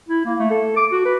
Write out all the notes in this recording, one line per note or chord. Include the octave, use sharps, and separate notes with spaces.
E4
A#3
A3
A4
D6
F#4
B4